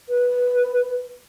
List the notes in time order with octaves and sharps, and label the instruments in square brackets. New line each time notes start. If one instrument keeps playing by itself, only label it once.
[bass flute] B4